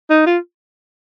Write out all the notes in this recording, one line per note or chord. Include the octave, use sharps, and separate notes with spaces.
D#4
F4